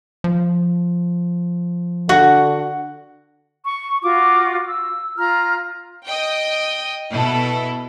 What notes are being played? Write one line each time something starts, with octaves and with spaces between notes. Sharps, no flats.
F3
D3 F#4 F#5
C#6
F4 F#4 D6
E6
F4 A#5 F6
D#5 G5
B2 E4 A4